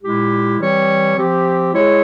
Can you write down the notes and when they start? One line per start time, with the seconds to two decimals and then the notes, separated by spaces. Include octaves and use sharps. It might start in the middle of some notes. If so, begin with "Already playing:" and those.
0.02 A#2 G#3 E4 G4
0.59 E3 G3 C4 G4 C#5
1.16 F3 C4 G4
1.73 G#3 E4 G#4 C#5